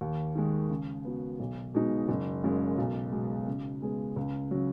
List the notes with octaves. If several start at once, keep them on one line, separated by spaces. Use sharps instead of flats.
D#2
D#3 G#3
C#3
B3 F#4
B1
B2 G#3 D#4
F#1
F#2 C#3 G#3
B1
B2 G#3
C#3
G#3 B3 G#4
C#2
C#3 F#3